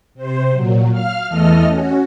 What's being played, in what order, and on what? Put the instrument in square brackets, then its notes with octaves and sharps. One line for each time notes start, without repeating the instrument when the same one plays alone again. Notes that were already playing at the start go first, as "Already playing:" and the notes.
[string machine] C3 C5
A#2 F#3
F5 F6
E2 E3 A3 A4 D#5 F6
C#4 F#4